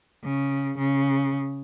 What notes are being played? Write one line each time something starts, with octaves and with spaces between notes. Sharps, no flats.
C#3
C#3